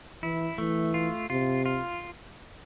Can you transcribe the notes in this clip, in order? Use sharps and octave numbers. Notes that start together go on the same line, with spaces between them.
E3 E4
E3 A3
F4
C3 F4
F4